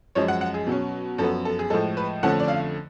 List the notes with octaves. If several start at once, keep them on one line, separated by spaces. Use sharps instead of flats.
F#2 F3 G#3 C#5
F#5
F#5
G#4
B2 F#3 C#4
F#2 F3 B3 A4
A4
G#4
A2 F3 G#3 A4
B4
F2 D3 F3 A3 C#4 F#5
D5
F5